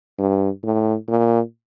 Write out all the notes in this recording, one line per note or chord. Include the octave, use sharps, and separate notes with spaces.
G2
A2
A#2